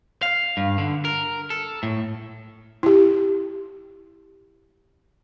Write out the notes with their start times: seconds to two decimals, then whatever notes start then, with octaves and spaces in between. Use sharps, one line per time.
0.23 F5
0.57 G2
0.78 D3
1.05 A#4
1.50 A4
1.83 A2
2.83 E4 G4